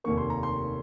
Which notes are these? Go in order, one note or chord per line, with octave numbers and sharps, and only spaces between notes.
F1 D#2 D#3 A#3 C#6
C6
A#5
C6